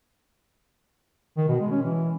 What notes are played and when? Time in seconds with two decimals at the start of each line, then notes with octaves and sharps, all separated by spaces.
1.37 D#3
1.49 B2
1.60 G#3
1.71 C#4
1.83 E3